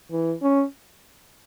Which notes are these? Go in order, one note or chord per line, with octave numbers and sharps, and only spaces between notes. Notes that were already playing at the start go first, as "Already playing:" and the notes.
E3
C#4